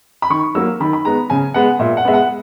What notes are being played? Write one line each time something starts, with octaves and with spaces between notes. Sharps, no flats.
B5
D#3 C#6
F#3 A#3 E6
D#3 B5
B5
G#3 B3 A#5
C#3 G#5
G#3 B3 F#5
A#2 E5
F#5
G#3 B3 E5
F#5